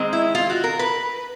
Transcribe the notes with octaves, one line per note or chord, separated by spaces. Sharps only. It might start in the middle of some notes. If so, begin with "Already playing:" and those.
Already playing: D#3 G#3 C4
E4
F4
F#4
A#4
B4